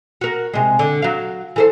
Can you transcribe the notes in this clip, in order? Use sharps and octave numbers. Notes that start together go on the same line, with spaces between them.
F#4 A#4
C3 G#3
D3
F#3 F5
E3 A4 C5